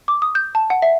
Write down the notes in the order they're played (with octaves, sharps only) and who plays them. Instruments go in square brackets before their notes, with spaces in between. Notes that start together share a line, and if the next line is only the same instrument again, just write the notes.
[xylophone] D6
D#6
G6
A5
F#5
E5